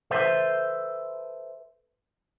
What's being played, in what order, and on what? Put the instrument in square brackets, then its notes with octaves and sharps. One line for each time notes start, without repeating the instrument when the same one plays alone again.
[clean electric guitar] A4 B4 C5 E5